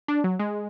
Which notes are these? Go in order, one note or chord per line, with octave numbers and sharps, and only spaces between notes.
D4
F#3
G#3